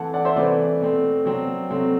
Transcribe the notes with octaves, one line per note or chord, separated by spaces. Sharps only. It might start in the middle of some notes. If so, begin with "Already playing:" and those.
Already playing: E3 A3 C4 F#5 A5
D5 F#5
C5 E5
C3 E3 A3 B4 D5
B2 A3 C4
C3 F#3 C4
C3 F#3 A3 C4